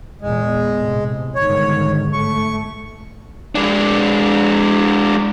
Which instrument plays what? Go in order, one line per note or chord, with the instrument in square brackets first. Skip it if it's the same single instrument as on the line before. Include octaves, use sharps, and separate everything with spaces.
[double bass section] E2 A#2 [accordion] G#3
[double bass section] A2 C3
[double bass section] G1 G#2 D#3 [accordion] C#5
[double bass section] A3 [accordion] C#6
[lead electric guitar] G#3 D4